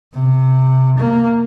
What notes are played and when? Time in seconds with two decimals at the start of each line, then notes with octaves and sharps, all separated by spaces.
0.13 C3
0.98 A#3